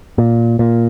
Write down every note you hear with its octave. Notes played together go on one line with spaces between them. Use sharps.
A#2
A#2